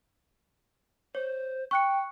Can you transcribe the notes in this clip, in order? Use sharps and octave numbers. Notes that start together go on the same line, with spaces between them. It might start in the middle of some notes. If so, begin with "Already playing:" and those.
C5 C#5
G5 C#6 F#6 C#7